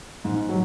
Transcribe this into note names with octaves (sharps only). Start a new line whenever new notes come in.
G#2
F#3